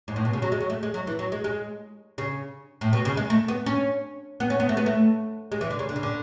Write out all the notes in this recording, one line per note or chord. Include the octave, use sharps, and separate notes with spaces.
G#2
A2
B2
C#3
F#3
G#3
F#3
A3
G#3
F#3
E3
F#3
G#3
G#3
C#3
A2
B2
C#3
G#3
A3
B3
C#4
B3
C#4
B3
A3
B3
A3
G#3
E3
D3
C#3
D3
C#3
D3